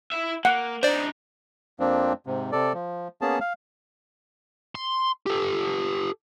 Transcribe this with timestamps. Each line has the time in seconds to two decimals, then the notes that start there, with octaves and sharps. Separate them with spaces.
0.12 E4 E5
0.45 A#3 F#5
0.83 D4 D#4 C5 D5
1.80 F2 F3 A#3 C4 D4
2.27 G#2 C3
2.52 C3 A4 D5
2.74 F3
3.21 A#3 B3 C#4 G#4 A5
3.41 F5
4.75 C6
5.26 G4 A4